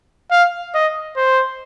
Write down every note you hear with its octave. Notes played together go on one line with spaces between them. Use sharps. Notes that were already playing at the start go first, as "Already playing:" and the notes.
F5
D#5
C5